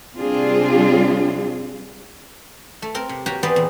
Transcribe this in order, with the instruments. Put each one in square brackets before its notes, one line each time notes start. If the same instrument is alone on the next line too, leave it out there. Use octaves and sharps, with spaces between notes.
[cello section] C3 G3 C4 D4 F4 G#4
[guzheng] A3
C4 A#4
C3
A#3 F#4 G4 C#5 F#5
E3 B3 C4 G4 G#4 D5
E2 A#2